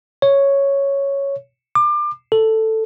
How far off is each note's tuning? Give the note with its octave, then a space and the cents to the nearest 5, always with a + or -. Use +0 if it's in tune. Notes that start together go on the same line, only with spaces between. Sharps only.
C#5 +0
D6 +30
A4 +5